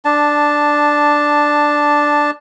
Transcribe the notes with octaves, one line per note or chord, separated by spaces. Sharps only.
D4 A5